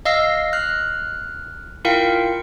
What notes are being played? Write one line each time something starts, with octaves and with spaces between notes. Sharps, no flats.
D#5 F5 E6 A#6 C7
F6 F#6
E4 F4 A#4 F5 G5 C#7